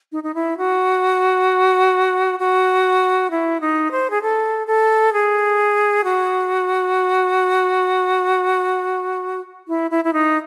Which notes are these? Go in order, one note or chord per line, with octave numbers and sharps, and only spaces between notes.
D#4
D#4
E4
F#4
F#4
E4
D#4
C5
G#4
A4
A4
G#4
F#4
E4
E4
E4
D#4